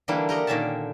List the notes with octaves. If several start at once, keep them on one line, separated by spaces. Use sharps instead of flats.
D3 E3 G3 A#3 D4 E4
G4 A#4 D#5 F#5
A#2 D3 D#3 C#4 E5 A5